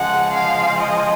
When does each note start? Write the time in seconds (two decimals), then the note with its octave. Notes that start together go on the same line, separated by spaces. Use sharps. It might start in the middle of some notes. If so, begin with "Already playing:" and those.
Already playing: C#3 F3 G#3 F#5
0.34 F5
0.80 D#5